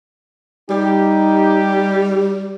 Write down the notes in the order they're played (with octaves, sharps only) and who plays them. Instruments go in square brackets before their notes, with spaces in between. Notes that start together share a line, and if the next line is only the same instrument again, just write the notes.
[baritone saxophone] G3 [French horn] D#4 [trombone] G4